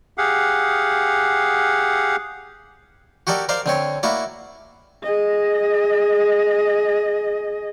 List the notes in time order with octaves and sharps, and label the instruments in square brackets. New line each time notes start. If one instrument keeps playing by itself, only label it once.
[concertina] G4 G#4 F5 F#5
[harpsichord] F#4 G4 A4 A#4 D5
A#4 C5 D5 F5
D3 C4 C#5
A#3 E4 F#4 D5
[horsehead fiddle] G#4 D#5